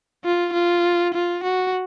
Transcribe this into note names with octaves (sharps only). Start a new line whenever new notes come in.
F4
F4
F4
F#4